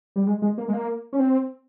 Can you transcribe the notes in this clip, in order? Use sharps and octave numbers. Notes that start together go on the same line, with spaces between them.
G3
G#3
G#3
A#3
G#3
A#3
C#4
C4